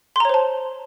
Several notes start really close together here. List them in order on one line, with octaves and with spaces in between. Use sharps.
C6 A#5 C#5 C5 A5